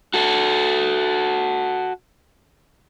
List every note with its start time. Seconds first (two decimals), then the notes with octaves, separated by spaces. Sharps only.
0.14 F#4 A4